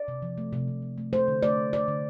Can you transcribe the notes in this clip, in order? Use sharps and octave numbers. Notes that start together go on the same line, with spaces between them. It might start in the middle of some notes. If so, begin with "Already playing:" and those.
Already playing: D5
C3
F3
A3
C3
C3
F3
A3
A3 C5
D3
A3 D5
D3
A3 D5
D3